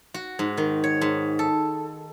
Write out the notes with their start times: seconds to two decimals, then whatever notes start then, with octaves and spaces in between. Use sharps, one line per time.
0.14 F#4
0.39 G#2
0.57 D#3
0.84 C#5
1.01 G#2
1.39 A4